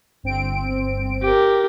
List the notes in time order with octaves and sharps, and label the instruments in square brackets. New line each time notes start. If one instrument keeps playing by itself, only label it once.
[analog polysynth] G1 C4 D7
[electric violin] G4 A#4